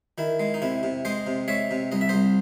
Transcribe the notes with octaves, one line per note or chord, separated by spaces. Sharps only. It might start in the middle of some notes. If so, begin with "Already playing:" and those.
D#3 E4
G#3
D#4
C3 E4
C3
G#3 C5 D#5
C3
G#3 C#5 E5
C3
C2 D#5
E5
C2 C5 D#5